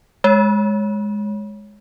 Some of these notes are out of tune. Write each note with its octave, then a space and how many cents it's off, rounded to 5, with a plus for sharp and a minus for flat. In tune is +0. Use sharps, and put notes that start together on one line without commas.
G#3 +0 C#5 +0